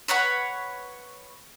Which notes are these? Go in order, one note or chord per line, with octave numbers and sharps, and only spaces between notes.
B4 C#5 F#5 B5